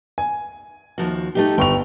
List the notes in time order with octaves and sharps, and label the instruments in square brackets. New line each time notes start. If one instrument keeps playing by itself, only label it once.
[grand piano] G#5
[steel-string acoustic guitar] D#2 F3 F#4
A3 D#4 G4
[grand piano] G1 C#6 F7 [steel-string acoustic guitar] G5